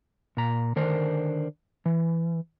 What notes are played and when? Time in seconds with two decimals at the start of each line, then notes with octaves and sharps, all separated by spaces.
0.37 A#2 A#5
0.76 D3 D#3 D4 A#4 C5
1.86 E3